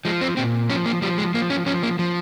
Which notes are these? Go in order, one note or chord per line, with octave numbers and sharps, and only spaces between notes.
F3 G#3
C4
A#2 C4
F3 C#4
A#3
F3 G3
G#3
F3 A#3
C#4
F3 C#4
A#3
F3